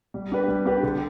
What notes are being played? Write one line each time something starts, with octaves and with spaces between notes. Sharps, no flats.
G3
D4 G4 B4
G3
D4 G4 B4
D3